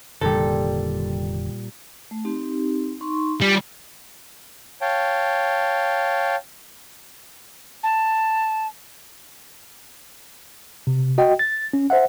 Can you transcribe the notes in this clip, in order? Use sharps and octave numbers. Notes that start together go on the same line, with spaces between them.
F1 A#2 D3 D#3 G3 A4
A3
C4 D#4 G4
D#4 C6 C#6
G3 F4 G#5
C#5 F5 G5 A5
A5
C3
F#4 D#5 G5
A6
C#4
C5 E5 F#5